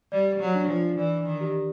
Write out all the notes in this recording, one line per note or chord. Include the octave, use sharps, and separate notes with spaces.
G3 D5
F#3
D4
F3
E3 D5
D#3
G4